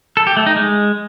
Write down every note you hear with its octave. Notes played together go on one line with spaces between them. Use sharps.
A4
G4
A3
D#4
G#3